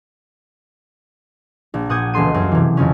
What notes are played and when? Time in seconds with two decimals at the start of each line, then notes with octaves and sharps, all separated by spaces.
1.74 A#1
1.89 A#2 F#5 D#6 G6 G#6
2.13 E1 C#2 A4 C6 D#7
2.34 F#2
2.52 C3 E3
2.77 F2 C#3 C#4